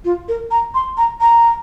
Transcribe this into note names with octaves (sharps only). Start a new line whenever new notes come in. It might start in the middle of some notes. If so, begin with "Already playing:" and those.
F4
A#4
A#5
C6
A#5
A#5